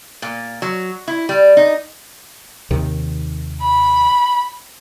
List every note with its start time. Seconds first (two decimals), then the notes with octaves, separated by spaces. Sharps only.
0.22 A#2
0.62 F#3
1.08 E4
1.29 G3
1.57 D#4
2.71 D#2 C3 D#3
3.62 B5